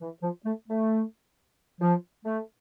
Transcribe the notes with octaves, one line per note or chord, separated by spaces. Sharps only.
E3
F3
A3
A3
F3
A3